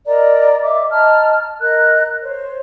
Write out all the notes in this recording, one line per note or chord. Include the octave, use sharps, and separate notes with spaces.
A#4 D5 D#5 A#5
D#5 E5 D6
D#5 A5 A#5 F6
A#4 D#5 F#6
C5 C#5